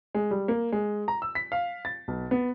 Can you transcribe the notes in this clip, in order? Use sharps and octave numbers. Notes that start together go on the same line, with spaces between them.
G#3
G3
A#3
G#3
A#5
E6
B6
F5
A6
B1
B3